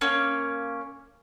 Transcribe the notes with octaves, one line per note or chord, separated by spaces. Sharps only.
A#3 C#4